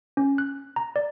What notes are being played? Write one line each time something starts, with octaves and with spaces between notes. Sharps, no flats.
C#4
F#6
A#5
D5